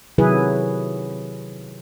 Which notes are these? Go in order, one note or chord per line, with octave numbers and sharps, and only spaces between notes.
C3 D#3 F#3 E4 G#4 B4